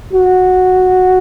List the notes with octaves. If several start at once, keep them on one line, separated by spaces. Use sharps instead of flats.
F#4